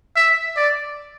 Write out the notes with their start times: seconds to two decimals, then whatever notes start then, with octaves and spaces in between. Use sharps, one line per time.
0.16 E5
0.56 D5